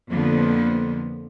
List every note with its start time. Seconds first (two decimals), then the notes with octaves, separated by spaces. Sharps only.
0.11 F2 D3 F3 A#3 B3